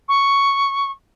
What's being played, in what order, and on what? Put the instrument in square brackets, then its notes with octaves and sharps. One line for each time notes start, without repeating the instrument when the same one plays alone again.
[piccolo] C#6